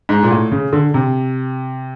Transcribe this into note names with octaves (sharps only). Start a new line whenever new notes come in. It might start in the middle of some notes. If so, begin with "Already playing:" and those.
G#2
A#2
A2
C#3
D3
C3